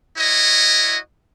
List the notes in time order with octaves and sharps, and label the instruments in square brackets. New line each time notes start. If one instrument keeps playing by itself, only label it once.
[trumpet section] E4 F#4 C#5 D#5